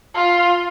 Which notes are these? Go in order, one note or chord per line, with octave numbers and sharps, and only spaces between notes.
F4